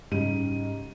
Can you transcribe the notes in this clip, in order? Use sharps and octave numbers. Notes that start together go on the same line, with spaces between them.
G#2 C#3 G3 D#7